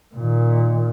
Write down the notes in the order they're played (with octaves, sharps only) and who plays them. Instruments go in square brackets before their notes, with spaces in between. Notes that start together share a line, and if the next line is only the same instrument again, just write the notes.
[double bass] A#2 D#3